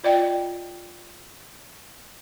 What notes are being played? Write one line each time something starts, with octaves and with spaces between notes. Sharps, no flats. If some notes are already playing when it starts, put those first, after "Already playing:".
F4 D5 D#5 G5